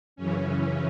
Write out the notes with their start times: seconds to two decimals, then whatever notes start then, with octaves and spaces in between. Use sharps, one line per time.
0.16 F#2 C#3 E3 C#4